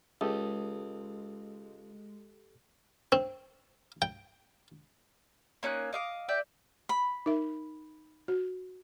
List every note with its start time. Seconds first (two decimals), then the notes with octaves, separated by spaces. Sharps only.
0.21 C#2 G#3 G4 A4 D#6
3.12 C4
4.02 G5
5.63 A#3 C#4 D#4 F#6
5.93 D#5 F5 D6
6.29 D5 E5 G5
6.89 B5
7.26 D#4 A#4 E5
8.28 F#4